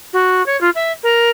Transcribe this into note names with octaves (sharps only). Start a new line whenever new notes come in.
F#4
C#5
F4
E5
A#4